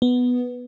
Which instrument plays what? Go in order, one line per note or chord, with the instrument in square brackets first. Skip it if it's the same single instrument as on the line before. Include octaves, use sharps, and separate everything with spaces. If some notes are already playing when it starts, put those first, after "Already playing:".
[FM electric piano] B3